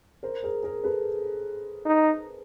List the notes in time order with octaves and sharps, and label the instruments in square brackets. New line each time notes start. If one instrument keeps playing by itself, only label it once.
[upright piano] A#4 C5
G#4 A#4
G#4 A#4
A4 B4
[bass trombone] D#4